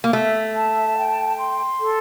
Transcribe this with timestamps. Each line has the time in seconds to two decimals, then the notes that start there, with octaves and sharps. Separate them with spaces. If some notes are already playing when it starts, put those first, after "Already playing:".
0.04 A#3
0.13 A3 E5
0.55 A5
0.96 G5
1.37 C6
1.79 A4